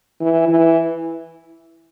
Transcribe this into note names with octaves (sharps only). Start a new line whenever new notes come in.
E3
E3